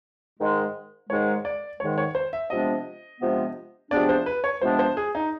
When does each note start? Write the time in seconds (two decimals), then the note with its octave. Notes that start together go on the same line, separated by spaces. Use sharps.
0.39 G#2 D#3 G#3
1.10 G#2 D#3 G#3 C#5
1.45 D5
1.80 G#2 D#3 G#3 C#5
1.98 C#5
2.15 C5
2.33 E5
2.50 C3 F3 G#3 B3 D4 D#5
3.20 C3 F3 G#3 B3 D4
3.91 C3 F3 G#3 B3 D4 D5
4.09 C5
4.26 B4
4.44 C#5
4.62 C3 F3 G#3 B3 D4 C5
4.79 C5
4.97 G#4
5.15 D#4